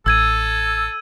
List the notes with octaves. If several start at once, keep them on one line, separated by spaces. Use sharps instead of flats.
A1 A4 E6 G#6 D#7